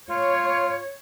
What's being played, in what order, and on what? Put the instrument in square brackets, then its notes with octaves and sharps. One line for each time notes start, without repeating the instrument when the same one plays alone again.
[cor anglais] F4 [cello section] C#5